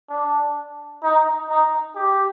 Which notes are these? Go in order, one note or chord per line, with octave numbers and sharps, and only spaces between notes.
D4
D#4
D#4
G4